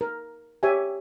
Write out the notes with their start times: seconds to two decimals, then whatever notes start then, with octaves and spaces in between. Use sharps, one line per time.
0.01 A#4
0.63 G4 C#5 E5 G#5